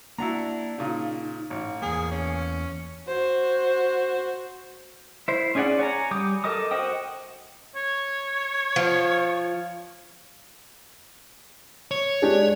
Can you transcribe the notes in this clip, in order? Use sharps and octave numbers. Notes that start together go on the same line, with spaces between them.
A#3 D4 E4 F#4 F#5 A#5
A#2 C#3 D#4
A1
E2 A#3 G#4
C#4
F#4 C5
E4 C5
C#4 D#4 G#4 D5 F#5
C#5 G#5 A#5
G3 D6 D#6 G6
A4 A#4 D#5 D6 D#6
F#4 C5 D#5 G5 D#6
C#5
F3
C#5
G#3 D4 G4